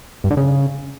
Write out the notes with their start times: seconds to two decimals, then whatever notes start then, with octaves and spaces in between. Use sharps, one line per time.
0.24 G2
0.31 D3
0.37 C#3